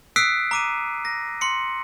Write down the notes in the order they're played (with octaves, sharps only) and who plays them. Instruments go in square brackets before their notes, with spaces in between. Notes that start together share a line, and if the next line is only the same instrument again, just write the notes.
[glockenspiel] D#6 E6 F#6 B6 C7 D7
A#5 D6 D#7
A#6
C6 C#7